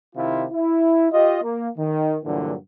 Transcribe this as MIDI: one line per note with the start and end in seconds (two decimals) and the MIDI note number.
0.16 0.45 48
0.16 0.45 51
0.16 0.45 64
0.16 0.45 65
0.51 1.07 64
1.11 1.39 65
1.11 1.39 67
1.11 1.39 75
1.42 1.68 58
1.77 2.16 51
2.24 2.54 43
2.24 2.54 46
2.24 2.54 50
2.24 2.54 52
2.24 2.54 54